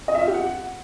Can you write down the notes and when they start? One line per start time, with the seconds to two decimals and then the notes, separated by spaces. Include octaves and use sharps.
0.08 D#5
0.15 E5
0.21 F4
0.28 G4
0.34 F#5